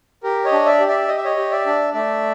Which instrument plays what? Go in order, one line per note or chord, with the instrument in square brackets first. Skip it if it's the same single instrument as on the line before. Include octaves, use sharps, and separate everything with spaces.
[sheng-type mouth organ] G4 A#4
C#5 D#5
D4
D5 E5
G4
D5 E5
G4 D#5
E5
C#5 D#5
G4
D5 E5
D4
A3 D5 E5